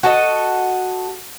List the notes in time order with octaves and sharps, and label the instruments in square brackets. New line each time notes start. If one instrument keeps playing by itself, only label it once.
[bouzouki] F#4 A4 D#5